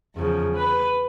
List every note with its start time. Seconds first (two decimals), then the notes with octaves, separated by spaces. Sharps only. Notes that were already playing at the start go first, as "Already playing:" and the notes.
0.14 E2 C#3 F3
0.55 B4